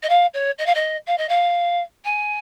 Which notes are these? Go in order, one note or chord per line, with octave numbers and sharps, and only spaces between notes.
D#5
F5
C#5
D#5
F5
D#5
F5
D#5
F5
G#5